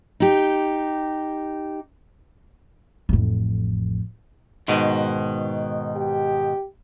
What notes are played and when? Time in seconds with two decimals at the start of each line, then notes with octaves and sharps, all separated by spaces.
0.20 D#4 G4
3.09 A1 F2
4.68 G#2 B2 D#3
5.96 G4